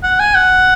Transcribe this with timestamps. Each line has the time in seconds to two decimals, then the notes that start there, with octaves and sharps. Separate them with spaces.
0.03 F#5
0.20 G#5
0.35 F#5